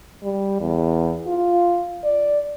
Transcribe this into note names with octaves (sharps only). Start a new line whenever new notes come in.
G3
E2
F4
D5